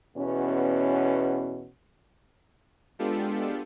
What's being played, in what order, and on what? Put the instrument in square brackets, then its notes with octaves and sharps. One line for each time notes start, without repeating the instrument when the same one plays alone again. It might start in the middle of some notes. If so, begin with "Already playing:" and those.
[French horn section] E2 B2 C#4
[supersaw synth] G#3 B3 D4 F4 G4 A4